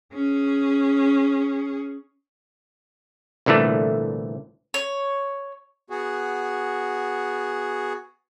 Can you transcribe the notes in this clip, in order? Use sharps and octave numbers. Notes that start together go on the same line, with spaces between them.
C#4 G#4
C2 A#2 D3 E3 A3
C#5
B3 F#4 G#4